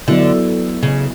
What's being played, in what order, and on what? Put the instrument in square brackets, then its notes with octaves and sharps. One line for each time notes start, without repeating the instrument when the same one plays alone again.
[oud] D3 [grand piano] F#3 B3 E4
[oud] C#3